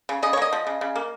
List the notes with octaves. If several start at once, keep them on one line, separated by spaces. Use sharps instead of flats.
C#3
C#3 D#5
C#5
A#3 D#5
F3
C#3
C#3
A#3